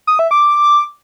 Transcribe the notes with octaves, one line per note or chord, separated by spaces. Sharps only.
D#6
E5
D6